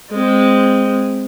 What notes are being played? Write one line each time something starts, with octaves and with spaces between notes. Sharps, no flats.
G#3 C4